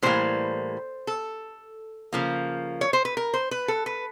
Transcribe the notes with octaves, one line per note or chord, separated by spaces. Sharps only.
A2 E3 G3 A#3 C5
A4
C#3 F3 A#3
C#5
C5
B4
A#4
C5
B4
A4
B4